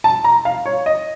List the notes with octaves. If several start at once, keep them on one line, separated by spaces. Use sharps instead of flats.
A5
A#5
F5
C#5
D#5